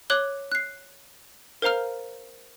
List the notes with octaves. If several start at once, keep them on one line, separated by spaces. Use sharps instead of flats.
C#5 D6 F#6 F#7 G7
F#6 C7
A#4 C5 F5 A#5 F6